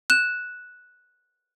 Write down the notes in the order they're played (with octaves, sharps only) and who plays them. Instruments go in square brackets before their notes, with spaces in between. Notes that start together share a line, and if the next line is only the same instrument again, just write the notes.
[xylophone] F#6 E7